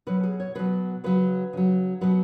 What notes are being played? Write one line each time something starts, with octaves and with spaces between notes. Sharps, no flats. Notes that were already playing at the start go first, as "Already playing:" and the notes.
B2 F#3 B4
G#4
C#5
B2 F#3 B4
C#3 F#3 B4
C#3 F#3
B2 F#3 B4